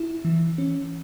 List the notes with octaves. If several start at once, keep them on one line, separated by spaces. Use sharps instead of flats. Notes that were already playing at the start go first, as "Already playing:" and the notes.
Already playing: E4
E3
C#4